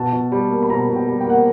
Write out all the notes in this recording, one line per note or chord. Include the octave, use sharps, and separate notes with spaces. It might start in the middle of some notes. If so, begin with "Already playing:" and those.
Already playing: B2 A5
B2
G3
A#3
B5
B2 A#5
B2
G5
G3
G5
A#3 F#5